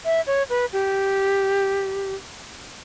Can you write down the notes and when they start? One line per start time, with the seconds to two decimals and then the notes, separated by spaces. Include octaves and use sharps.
0.05 E5
0.27 C#5
0.50 B4
0.73 G4